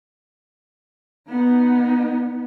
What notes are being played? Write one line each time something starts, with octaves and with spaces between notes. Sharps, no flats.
B3 D#4